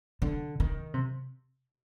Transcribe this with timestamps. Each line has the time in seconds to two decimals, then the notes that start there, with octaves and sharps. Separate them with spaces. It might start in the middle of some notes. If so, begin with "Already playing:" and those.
0.22 D3
0.60 D#3
0.94 C3